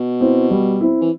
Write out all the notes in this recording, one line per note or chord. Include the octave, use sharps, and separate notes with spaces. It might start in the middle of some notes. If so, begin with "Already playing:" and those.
Already playing: B2
C4 E4
G3
C4 E4
E3